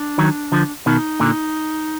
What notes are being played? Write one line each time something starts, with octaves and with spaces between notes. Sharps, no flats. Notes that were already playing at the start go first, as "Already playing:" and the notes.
Already playing: D4
D#3 F#3
D3 F3
B2 D#3 D#4
A#2 D3